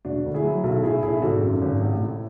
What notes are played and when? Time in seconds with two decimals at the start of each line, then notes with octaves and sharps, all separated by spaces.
0.05 E1 D4 F#4
0.25 D2
0.34 E4 G#4
0.44 F#3
0.64 B1 F#4 A4
0.83 A2 E4 G#4
1.03 B1 E4 G#4
1.22 G#1 F#4 A4
1.42 F#2
1.62 G#1
1.81 A1
2.00 A2